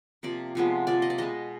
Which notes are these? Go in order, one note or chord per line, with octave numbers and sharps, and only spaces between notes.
C3 F3 A#3 D5
C3 F3 G#3 B3
C3 F3 A#3 D5
D#5
D5
B2 G#3 B3 D#5